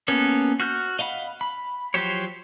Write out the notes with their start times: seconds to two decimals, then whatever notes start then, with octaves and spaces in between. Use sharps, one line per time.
0.08 A#3 B3 C#4 A4
0.60 F#4 F6 G6
0.99 D#5 F5 F#5 B5
1.41 B5
1.94 F3 F#3 G4 C5 C#5